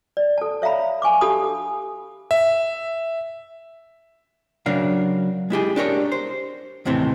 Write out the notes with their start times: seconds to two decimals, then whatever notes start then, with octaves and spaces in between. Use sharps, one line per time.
0.17 D5
0.38 A4 A5
0.62 C#5 E5 F5 A#5 B5
1.02 F5 G#5 C#6 D6
1.21 D4 G4 A4 A5 B5 D#6
2.31 E5
4.66 C#3 F#3 D4 A#4 F5
5.50 G#3 E4 G4 G#4
5.76 D4 G4 A#4 C#5
6.12 C5
6.85 D#2 A2 C3 E3 C4